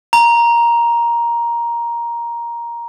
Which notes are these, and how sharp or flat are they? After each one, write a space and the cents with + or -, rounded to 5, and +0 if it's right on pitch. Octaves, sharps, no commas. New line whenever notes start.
A#5 +10